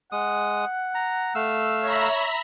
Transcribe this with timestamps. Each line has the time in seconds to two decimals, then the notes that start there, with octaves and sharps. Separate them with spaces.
0.12 G#3 F#5 D#6
0.95 A#5
1.35 A3 F5 E6
1.82 C#5 E5 A#5 B5